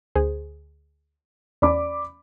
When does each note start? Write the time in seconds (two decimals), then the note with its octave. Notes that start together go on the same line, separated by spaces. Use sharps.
0.15 D2 G#4 C5
1.62 E2 C#4 D5 B5 D6